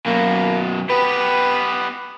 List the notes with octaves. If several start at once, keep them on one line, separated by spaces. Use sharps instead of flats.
F#2 B2 A#3
B3 G4 B4